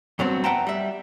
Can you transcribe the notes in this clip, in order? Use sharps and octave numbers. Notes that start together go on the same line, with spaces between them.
G2 F#3 B3 C4
B4 E5 F#5 G5 A5 A#5
G3 E5